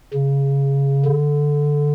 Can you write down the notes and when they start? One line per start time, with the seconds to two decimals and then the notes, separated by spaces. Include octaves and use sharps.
0.13 C#3
1.05 D3